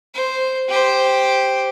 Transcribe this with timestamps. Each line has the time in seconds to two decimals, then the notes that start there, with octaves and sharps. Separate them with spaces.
0.15 C5
0.69 G4 C5